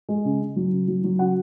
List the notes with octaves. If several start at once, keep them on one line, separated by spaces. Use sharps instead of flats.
G#3
C#3
C#3
F#3
C#3
F#3
F#3
C#3 F#4 F#5